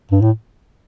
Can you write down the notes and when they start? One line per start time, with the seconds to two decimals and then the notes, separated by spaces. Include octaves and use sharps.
0.11 G2
0.22 A2